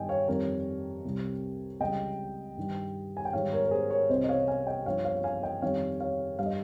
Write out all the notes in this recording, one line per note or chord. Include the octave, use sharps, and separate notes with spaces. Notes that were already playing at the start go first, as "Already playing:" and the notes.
Already playing: G2 D#3 G3 D#5 G5 G#5
C#5 F5
F2 D#3 G3 A#4 C#5
C2 C3 G3
C#2 C#3 G3 D#5 G5
G2 D#3 G3
G#5
G5
G#2 D#3 G3 C#5 F5
A#4 C#5
A#4
G#4 C5
A#4 C#5
C2 C3 G3 C5 D#5
D#5
C#5 F5
F5 G#5
D#5 G5
G2 F3 C#5 F5
C#5 F5
F5 G#5
D#5 G5
F2 D#3 G3 C#5 F5
C#5 F5
G2 G3 F5
D#5